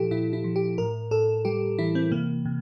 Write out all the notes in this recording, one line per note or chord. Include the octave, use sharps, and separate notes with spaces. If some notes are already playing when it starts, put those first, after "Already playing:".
Already playing: A#2 F3 E4 G4 A4
A#2 E4
E4
F3
G4
A2 A#4
A2 A4
G3 G4
E3 E4
C4
C3 A#3
C3